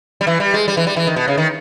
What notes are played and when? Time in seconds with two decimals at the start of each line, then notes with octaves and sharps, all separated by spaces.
0.21 G3
0.27 E3
0.40 G3
0.54 G#3
0.68 G3
0.77 E3
0.87 G3
0.96 E3
1.07 D#3
1.16 B2
1.28 C#3
1.38 D#3